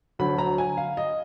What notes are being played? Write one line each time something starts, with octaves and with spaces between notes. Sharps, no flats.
D2 D3 F#3 B5
A#5
G#5
F5
D#5